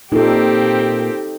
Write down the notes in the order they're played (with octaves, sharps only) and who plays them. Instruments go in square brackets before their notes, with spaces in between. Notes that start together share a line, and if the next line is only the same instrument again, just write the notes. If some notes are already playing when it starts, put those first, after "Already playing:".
[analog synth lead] A#2 [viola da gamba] C4 G4 [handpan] D#4 A4